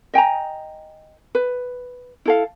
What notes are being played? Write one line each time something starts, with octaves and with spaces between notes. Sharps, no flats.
D#5 G5 G#5 A#5
B4
E4 A4 F5